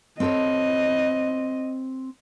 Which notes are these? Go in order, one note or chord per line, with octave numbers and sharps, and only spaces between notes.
C4 A4 C#5 D#5